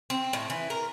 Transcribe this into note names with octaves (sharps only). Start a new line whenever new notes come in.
C4
A2
E3
A#4